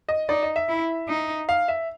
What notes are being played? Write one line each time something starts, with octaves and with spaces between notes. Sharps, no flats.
D#5
D#4 D5
D#5
E5
E4
D#4
F5
E5